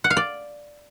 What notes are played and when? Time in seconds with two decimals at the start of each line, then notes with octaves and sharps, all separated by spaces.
0.04 F#5
0.10 F5
0.17 D5